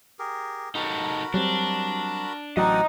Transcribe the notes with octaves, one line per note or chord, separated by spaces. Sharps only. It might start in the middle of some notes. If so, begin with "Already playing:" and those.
G4 G#4 A#4
D#4 F#4 G4 A4 A#4 B5
F#3 G3 C4 D4
A1 F#3 C4 D5 D#5 F#5 A#5